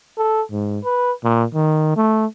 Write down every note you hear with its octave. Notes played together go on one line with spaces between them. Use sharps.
A4
G#2
B4
A#2
D#3
A3